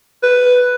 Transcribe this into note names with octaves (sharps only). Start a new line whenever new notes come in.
B4